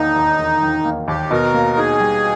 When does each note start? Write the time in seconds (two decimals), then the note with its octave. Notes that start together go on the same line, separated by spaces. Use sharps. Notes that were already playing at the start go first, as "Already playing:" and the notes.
Already playing: E1 D#3 A#3 D#4
0.16 D#2
0.39 E1
0.62 D#3
0.85 A#3
1.08 D#2 G4
1.31 B2 A#4
1.54 A#3
1.77 D#4 G#4
2.00 G3